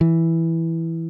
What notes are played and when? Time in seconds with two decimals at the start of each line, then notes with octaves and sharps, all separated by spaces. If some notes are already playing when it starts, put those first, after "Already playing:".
0.01 E3